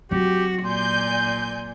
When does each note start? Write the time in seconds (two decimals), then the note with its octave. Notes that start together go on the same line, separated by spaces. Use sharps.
0.11 F#3 C4 F#4 G4
0.65 A#2 D5 G#5 C6 G6